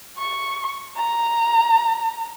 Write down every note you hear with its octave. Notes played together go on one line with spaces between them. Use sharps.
C#6
A#5